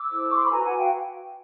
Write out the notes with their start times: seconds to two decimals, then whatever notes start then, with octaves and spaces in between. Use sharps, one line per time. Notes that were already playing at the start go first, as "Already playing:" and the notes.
Already playing: D6 E6
0.10 E4 A4 C5
0.30 C#6
0.37 C6
0.44 B5
0.51 F#4 B4 G#5 A#5
0.64 F#5 G#5
0.78 F5 G5